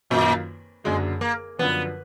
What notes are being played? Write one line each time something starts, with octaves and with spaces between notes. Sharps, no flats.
F#2 A#2 D#3 A#3 F4
F#1 F#2 D3 F#3 G#3 D4
A#3
F#2 D3 F3 B3